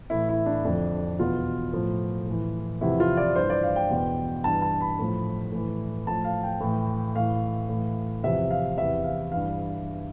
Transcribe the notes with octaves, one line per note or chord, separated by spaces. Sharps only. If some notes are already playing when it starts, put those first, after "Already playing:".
A2 E3 E4
E4
D4
F2 D3 F3 D4
E2 B2 F4
A2 F3
A2 E3
E2 C3 F3 E4
F4
D5
G2 E3 C5
D5
F5
G5
E2 B2
G2 E3 A5
A5
B5
A2 F3
A2 E3
A2 F3 A5
F5
G5
A2 E3
A2 E3 F5
A2 E3
E2 C3 F3 E5
F5
E2 C3 E3 E5
F5
G2 E3 F5